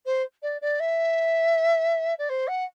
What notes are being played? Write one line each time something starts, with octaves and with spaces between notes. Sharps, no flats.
C5
D5
D5
E5
D5
C5
F#5